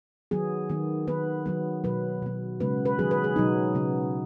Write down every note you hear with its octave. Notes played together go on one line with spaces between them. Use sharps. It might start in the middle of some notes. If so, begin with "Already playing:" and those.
D#3 F#3 B3 G#4
D#3 B3
D#3 B3 B4
D#3 F#3 B3
B2 F#3 B3 B4
B2 B3
C#3 G#3 B3 B4
B4
D#3 F#3 B3 G#4
B4
G#4
B2 F#3 B3 D#4
C#3 B3